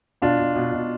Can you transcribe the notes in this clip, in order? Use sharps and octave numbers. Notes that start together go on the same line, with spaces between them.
B2 D4 F4
B2
B2
B2